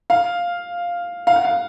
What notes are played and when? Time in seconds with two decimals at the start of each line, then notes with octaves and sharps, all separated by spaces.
0.10 F5
1.27 F5
1.36 F#5
1.45 F5